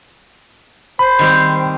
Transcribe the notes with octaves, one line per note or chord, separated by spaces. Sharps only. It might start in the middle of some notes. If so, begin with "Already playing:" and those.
C5 B5
D#3 G3 C4